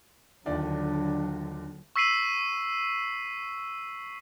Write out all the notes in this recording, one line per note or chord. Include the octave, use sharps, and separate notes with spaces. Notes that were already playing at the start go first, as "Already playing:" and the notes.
D#1 D#2 D3 F#3 D4 D5
C#6 E6 B6 C7 D#7 F#7